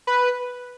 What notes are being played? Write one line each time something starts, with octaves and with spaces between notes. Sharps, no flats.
B4